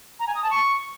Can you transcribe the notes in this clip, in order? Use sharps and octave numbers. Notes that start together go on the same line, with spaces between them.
A#5
G#5
D#6
A5
C#6